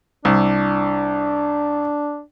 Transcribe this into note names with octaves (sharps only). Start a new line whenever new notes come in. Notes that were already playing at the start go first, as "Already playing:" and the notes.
C2 D4